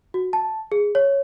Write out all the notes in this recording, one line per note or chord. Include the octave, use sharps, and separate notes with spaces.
F#4
A5
G#4
C#5